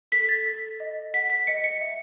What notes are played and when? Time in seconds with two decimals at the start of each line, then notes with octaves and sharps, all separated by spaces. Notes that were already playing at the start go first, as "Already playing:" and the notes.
0.12 A4 B6
0.29 A6
0.46 A4
0.80 D#5
1.14 F#5 B6
1.30 B6
1.47 D#5 C#7
1.64 C#7
1.81 E5